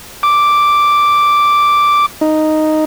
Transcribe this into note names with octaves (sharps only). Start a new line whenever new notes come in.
D6
D#4